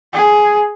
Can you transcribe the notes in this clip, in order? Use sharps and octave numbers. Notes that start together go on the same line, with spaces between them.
G#4